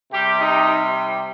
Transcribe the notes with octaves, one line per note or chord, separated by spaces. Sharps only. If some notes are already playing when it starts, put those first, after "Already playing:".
C3 G3 G4
D#4